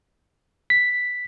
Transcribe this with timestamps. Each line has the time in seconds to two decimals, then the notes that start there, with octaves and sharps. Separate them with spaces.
0.70 B6